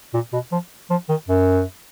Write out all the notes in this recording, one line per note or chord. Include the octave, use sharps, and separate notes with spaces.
A#2
B2
F3
F3
D#3
F#2